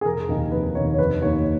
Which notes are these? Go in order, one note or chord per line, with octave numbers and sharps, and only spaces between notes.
G#4
F1 A#4
D#2 D#3
F1 B4
D#2 D#3 C#5
C#5
F1 B4
D#2 D#3 A#3 C#5